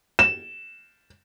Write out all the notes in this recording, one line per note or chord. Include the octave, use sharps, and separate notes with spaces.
E7